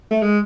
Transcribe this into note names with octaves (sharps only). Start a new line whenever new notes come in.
A3
G#3